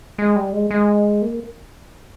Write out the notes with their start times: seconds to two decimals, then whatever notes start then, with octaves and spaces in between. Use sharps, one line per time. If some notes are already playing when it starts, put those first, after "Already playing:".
0.18 G#3
0.36 G3
0.53 G#3
0.71 G#3
1.22 A#3